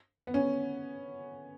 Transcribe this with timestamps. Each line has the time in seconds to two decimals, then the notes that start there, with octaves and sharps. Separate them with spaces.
0.27 B3
0.34 C#4